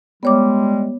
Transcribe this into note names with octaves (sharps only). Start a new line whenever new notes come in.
G3 G#3 B3 C#5 D6